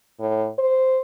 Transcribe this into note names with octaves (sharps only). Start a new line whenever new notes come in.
A2
C5